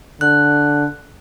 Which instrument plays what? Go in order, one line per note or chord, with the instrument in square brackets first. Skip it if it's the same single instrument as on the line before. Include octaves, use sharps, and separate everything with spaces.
[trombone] D3 [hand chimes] F#6